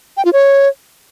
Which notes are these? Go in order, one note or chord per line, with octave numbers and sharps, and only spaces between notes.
G5
F4
C#5